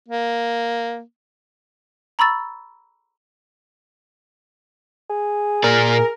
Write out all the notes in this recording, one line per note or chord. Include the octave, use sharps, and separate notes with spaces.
A#3
A#5 B5 C#6 E6 A6
G#4
A#2 A#4 D5